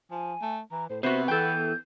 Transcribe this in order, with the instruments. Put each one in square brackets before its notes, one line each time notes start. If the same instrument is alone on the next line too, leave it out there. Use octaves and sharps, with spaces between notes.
[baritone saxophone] F3 [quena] G#5
[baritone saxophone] A3
[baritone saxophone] E3 [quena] A#5
[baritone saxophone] A2 [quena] C5
[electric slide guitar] C3 [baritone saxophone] B3 [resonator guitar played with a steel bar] F#4 C5 [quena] E5
[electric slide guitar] E2 E3 [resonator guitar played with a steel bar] A4 G5 [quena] G6